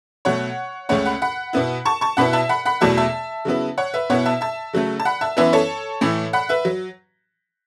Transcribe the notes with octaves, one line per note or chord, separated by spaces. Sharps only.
B2 F#3 A3 C#5 F#5
C#2 C#3 A3 C#4 C#5 F#5
F#5 B5
F#5 B5
B2 B3 E4
A5 C#6
A5 C#6
B2 B3 E4 F#5 B5
E5 A5
F#5 B5
F#5 B5
E2 B2 F#3 A3 E4 E5 A5
E5 A5
C#3 F#3 B3 E4
C#5 F#5
B4 E5
B2 B3 E4 C#5 F#5
E5 A5
E5 A5
C#3 F#3 A3
A5
F#5 B5
E5 A5
F#2 E3 B3 E4 B4 E5
A4 C#5
A2 E3 A3 E4
F#5 B5
B4 E5
F#3